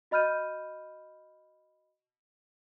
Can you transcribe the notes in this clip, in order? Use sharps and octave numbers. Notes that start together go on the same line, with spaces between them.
F#4 D#5 B5 F6 G6 D#7